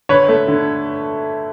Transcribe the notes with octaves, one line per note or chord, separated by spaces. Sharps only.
D3 B4 C#5
A3
D3